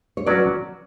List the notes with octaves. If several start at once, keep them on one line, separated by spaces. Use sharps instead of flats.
C#5
F#3 C#4 F#4 B4 D5